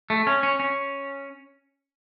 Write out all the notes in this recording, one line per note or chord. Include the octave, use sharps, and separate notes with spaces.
A3
C#4
C#4
C#4